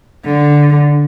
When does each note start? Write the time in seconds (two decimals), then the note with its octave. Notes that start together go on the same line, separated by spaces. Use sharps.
0.24 D3